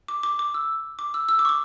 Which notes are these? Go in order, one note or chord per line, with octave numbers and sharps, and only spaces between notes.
D6
D6
D6
E6
D6
E6
E6
D6
C#6
D6